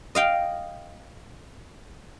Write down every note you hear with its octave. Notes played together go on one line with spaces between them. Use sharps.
D#5 F5 G5